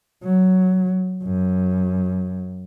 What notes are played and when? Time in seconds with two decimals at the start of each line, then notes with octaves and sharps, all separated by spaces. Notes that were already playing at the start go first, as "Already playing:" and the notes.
0.24 F#3
1.23 F#2